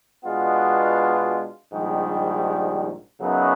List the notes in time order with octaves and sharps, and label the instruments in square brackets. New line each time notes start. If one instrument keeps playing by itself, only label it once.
[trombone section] B2 G#3 B3 D4 F4
A#1 G#2 D#3 G3
F#2 C#3 F#3 B3 D#4